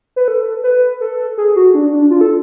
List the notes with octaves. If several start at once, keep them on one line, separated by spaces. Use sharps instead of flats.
B4
A4
B4
A4
G#4
F#4
D4
D4
F4
A4